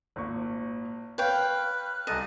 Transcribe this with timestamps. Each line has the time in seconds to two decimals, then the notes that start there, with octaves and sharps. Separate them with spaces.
0.16 G#1 A#2 C#6
1.18 B4 C#5 F5 G5 F6 F#6
2.07 C2 A4 D#5 G#5 D#7